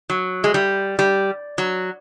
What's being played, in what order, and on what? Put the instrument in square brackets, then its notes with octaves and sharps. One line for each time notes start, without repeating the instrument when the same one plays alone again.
[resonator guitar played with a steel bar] F#3
G#3
G3
G3
F#3